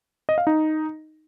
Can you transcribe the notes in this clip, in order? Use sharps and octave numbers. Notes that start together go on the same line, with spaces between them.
D#5
F5
D#4